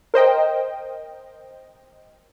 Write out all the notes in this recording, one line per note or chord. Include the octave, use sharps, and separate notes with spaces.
A#4 C5 D#5 G5